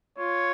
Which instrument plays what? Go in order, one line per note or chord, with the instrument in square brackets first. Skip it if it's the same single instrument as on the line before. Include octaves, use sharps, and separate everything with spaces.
[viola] F4 [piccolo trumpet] C#5